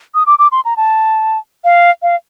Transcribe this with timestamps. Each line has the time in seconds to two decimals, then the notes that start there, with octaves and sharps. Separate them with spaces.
0.15 D#6
0.26 D6
0.39 D6
0.52 C6
0.65 A#5
0.77 A5
1.64 F5
2.02 F5